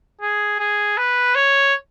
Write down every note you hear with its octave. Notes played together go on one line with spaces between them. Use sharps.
G#4
G#4
B4
C#5